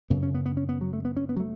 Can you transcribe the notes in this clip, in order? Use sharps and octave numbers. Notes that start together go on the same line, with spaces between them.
F#2 C#3 B3
C#4
B3
B3
C#4
B3
F#3
A3
B3
C#4
B3
F#3
A3